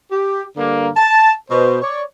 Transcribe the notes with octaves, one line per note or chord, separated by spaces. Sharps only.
G4
G2 D3 A#3
A5
B2 C5
C#5 D5